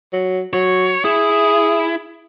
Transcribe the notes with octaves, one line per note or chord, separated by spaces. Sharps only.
F#3
F#3 C#5
E4 G#4